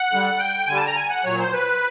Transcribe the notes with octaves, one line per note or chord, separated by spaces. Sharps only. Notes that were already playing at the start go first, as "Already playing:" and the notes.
Already playing: F#5
D3 G3
G5
D3 G3 G#5
A5
A#5
G#5
F#5
A#2 F#3 C#5
C5
B4